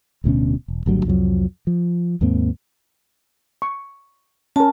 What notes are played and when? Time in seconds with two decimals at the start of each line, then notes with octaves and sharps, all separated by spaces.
0.24 D1 D2 B2 C#4
0.68 E1
0.86 G#1 D2 F#3 G3
1.05 C2 F2 F3 F#3
1.67 F3
2.21 D#2 G#2 A#3 C4
3.62 C#6
4.56 C#4 A#4 A5